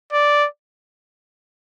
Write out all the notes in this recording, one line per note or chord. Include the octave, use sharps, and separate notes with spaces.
D5